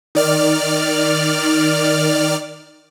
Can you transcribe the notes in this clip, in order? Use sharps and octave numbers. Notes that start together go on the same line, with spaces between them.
D#3 D5 F6